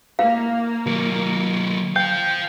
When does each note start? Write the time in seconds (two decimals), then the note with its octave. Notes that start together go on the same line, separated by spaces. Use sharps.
0.19 A#3 E4 F5
0.86 D#3 F#3 E4
1.96 C5 F5 G5 G6